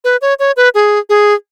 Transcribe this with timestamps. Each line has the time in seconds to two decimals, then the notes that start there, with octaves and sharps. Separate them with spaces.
0.04 B4
0.22 C#5
0.39 C#5
0.57 B4
0.75 G#4
1.09 G#4